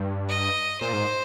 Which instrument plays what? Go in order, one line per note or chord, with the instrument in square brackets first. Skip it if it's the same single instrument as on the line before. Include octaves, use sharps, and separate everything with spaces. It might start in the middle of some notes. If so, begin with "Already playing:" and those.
Already playing: [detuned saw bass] G2
[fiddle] D#5
[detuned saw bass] A#2 [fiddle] C5
[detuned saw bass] G#2